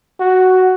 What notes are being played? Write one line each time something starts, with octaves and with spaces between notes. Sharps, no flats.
F#4